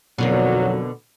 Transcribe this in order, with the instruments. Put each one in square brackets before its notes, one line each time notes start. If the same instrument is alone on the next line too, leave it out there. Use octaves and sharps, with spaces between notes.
[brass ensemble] B1 F2 F#3 [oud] B2 D3 A#3